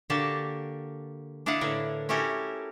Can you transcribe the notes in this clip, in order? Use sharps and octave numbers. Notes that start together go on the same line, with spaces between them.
D3 A#3 F#4 G4 D5 A5
D4 E4 D#5 F5 F#5
A2 D3 A#4 B4
C#4 E4 F#4 G4 A4 A#4